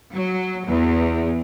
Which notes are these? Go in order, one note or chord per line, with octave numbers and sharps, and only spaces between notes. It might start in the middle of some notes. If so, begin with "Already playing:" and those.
F#3
E2